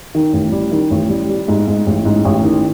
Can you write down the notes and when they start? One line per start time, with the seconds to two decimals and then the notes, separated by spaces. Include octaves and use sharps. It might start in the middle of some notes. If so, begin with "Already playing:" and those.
0.15 D#3
0.33 A1
0.52 G3
0.71 D#3
0.91 A1
1.10 G3
1.29 G3
1.48 G#2
1.67 G#2
1.87 A1
2.05 G#2
2.25 A1
2.43 D#3